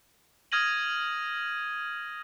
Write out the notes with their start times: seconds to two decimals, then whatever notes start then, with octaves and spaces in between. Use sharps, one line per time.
0.52 D#6 F6 G#6 A#6 D#7 F#7